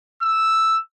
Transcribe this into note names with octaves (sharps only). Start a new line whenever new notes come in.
E6